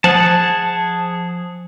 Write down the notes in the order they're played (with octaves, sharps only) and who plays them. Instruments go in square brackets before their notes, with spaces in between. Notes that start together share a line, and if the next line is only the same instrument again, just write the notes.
[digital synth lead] F3 [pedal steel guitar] G#4 F#5 A5